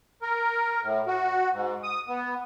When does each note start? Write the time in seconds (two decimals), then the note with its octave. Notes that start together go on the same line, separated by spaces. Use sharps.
0.22 A#4
0.83 A2
1.07 F#4
1.53 G#2
1.83 D#6
2.08 B3